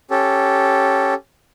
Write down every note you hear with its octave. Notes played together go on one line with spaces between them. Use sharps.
C#4 G4 A4